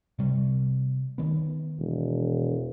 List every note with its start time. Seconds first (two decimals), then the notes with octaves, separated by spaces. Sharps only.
0.19 C3 G3
1.18 D#3 B3
1.79 E1